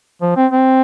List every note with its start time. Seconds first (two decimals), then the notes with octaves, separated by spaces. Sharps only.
0.22 F3
0.36 C4
0.51 C4